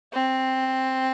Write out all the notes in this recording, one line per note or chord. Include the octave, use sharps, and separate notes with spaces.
C4